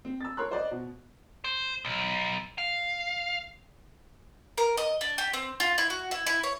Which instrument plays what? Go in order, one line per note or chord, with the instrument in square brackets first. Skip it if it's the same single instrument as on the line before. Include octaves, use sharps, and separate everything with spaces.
[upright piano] C4
E6 A6
A#4 C#5 C6 F#6
C5 D5 D#5
B2
[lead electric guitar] C5
B1
F5
[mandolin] A#4
D#5
D4
G4
C4
F4
E4
F#4
E4
E4
C#5